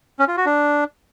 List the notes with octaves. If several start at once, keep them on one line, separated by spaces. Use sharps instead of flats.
C#4
F4
F#4
D4